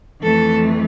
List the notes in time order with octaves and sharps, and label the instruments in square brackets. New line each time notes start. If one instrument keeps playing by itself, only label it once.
[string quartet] F2 E3 A3 A4